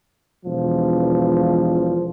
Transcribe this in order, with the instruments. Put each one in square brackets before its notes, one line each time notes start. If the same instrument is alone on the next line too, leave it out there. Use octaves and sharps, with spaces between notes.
[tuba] E1 [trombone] F3